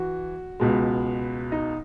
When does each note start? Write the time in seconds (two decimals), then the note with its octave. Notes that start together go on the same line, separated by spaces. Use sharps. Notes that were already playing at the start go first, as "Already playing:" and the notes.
Already playing: E3 F#4
0.60 C#2 B2 G#3
1.52 D#4